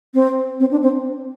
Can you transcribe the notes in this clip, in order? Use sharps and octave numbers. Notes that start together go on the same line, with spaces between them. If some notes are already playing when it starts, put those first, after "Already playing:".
C4
C4
D4
C4